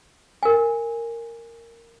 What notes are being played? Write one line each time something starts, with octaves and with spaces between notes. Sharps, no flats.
A#4 G#5